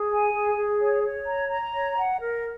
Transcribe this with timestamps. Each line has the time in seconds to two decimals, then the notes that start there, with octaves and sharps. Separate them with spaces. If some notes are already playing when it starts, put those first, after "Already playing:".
Already playing: G#4
0.11 G#5
0.33 G#4
0.57 G#4
0.81 C#5
1.03 C#5
1.26 A#5
1.50 A#5
1.73 C#5
1.97 F#5
2.19 A#4